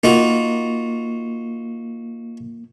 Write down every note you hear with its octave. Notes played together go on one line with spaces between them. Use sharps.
A#3 D#4 F4 F#4